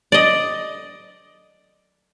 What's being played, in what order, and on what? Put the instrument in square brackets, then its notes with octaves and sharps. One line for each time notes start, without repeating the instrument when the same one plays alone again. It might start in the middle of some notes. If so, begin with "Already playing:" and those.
[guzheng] D5 D#5